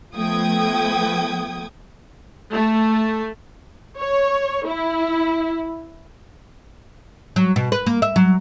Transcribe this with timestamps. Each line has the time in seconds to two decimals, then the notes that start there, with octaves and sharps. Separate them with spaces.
0.16 F3 A3 B3 G5 D#6 G#6
2.53 A3
3.98 C#5
4.66 E4
7.36 F#3
7.56 B2
7.72 B4
7.86 A#3
8.02 E5
8.16 F#3